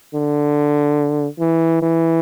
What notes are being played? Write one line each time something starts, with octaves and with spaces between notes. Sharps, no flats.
D3
E3
E3